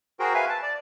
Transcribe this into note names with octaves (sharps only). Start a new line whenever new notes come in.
F#4 G#4 A#4 C5 G5
B4 E5 F5 G#5
A5
D5